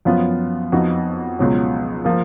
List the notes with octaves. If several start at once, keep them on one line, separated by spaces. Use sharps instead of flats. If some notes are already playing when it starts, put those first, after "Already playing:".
F#2 F3 B3 F4
F2 F3 B3 D#4 F#4
C#2 B2 F#3
F3 A#3